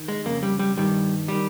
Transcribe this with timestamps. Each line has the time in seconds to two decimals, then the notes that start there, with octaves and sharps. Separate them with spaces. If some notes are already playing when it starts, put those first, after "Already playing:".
Already playing: D#3
0.08 G#3
0.25 F2 C#3 A#3
0.43 G3
0.59 G3
0.77 G2 D#3 G3
1.28 D#3 G3